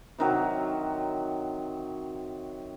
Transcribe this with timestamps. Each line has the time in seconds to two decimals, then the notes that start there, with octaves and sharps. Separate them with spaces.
0.19 C3 D#3 F#3